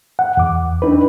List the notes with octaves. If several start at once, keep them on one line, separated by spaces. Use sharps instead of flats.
F#5
E2 D6
D4 D#4 B4